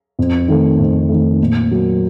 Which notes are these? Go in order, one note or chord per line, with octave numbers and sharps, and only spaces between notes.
F2
D#3 A3
F2
D#3 A3
A#2
F#3 A#3